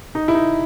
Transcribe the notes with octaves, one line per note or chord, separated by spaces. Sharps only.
D#4
E4
D#4